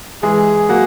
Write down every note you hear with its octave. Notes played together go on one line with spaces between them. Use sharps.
E3 G#3 G#4
F#3 A#3 F#5